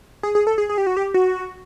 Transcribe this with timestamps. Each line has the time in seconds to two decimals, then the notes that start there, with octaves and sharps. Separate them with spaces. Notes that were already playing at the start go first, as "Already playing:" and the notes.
0.23 G#4
0.35 G#4
0.47 A4
0.58 G#4
0.69 G#4
0.78 G4
0.87 F#4
0.97 G4
1.14 F#4